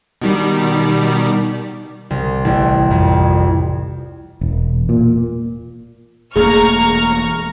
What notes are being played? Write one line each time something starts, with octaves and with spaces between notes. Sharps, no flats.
B2 D#3 G3
C2
A1
F2
E1
A#2
E1 A3 A#3 G#4 A#5 C#6 F6